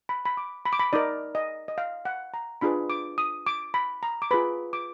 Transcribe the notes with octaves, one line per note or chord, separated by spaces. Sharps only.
B5
B5
D6
B5
D6
B5
D#4 A#4 D5
D#5
D#5
F5
F#5
A#5
D4 F4 G#4 B4 B5
D6
D#6
D6
B5
A#5
D6
F4 G#4 B4 B5
D6